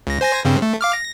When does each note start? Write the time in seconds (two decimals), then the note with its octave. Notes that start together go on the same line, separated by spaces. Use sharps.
0.07 C#2 A#6
0.21 C5 G#5 A#6
0.45 G2 C#3 C4
0.62 A3
0.81 F5 D6 F6
0.93 A#6